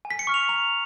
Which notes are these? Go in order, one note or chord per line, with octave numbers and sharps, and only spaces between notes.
G#5
B6
C#7
C#6 F6
F7
A#5 F7